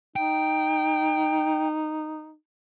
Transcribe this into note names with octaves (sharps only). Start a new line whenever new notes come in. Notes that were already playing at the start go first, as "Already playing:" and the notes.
D#4 G5